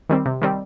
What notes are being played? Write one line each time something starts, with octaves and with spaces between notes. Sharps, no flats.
D#3 G3 C4
C3
D#3 G3 C4